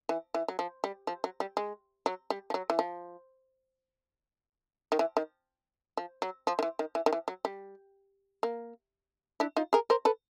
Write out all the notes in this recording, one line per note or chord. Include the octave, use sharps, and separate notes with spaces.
E3
E3
F#3
F3
G3
F3
F#3
G3
G#3
F#3
G3
F3
F#3
E3
F3
D#3
E3
D#3
F3
F#3
F3
D#3
E3
D#3
E3
D#3
E3
F#3
G3
A#3
D4 E4
D#4 F4
G#4 A#4
A#4 C5
A4 B4